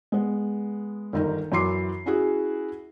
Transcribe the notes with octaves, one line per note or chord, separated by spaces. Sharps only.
G#3 B3
G1 D#3 A#4
F#2 E3 E4 C6 D6 C7
C#4 E4 F#4 G#4